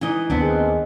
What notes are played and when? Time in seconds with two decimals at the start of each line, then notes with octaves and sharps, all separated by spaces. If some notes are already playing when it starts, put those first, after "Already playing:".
0.01 E3 D#4 D#5
0.30 D#2 B3 C4 D4
0.41 G#3